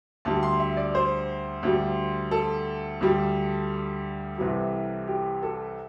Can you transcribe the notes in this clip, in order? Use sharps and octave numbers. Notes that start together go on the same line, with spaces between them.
D2 D3 G3 A5
C6
E5
D5
C5
D2 D3 G3
A4
D2 D3 G3
C2 C3 E3 G3
G4
A4